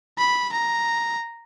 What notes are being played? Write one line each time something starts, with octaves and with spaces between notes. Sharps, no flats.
B5
A#5